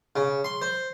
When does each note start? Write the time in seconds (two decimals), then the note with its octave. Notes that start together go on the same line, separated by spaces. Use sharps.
0.16 C#3
0.44 C6
0.62 C5